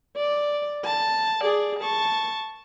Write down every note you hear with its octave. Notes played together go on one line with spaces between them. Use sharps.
D5
A5
G#4 D5
A5 C#6